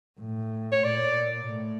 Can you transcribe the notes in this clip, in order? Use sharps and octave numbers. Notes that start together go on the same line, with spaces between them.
A2
C#5
A#2 D5
A2